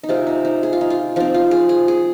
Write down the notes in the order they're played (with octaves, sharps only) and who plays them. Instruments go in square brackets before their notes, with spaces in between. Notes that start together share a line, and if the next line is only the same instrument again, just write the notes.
[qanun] D#4
C3 G#3 C4 F4
D#4
D#4
G#4
F4
D#4
F4
F3 C4 D#4
F4
G#4
G#4
G#4